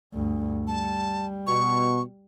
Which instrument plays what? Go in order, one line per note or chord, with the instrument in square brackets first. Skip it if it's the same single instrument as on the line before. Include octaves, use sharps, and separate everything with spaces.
[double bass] D2 G2
[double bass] G3 [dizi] A5
[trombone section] B2 [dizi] C#6